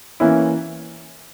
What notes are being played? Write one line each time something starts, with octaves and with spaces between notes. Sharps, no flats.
E3 A#3 C#4 E4